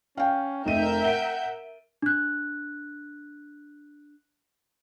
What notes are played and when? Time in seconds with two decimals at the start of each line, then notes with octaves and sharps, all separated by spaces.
0.17 C#4 F5 G5
0.65 F1 D#4 A#4 E5 G6 D#7
1.04 F#5 D7 G7
2.02 D4 F#6